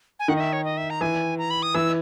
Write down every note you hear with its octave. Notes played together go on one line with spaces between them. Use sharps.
G#5
D#3 F#5
D#5
E5
C#5
D#5
E5
A#5
E3 G#5
A#5
B5
D#6
E3 E6